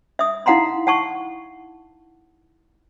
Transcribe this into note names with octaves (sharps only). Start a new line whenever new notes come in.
E5 D#6
D#4 E4 F5 F#5 A#5 C6
F#5 A5 C#6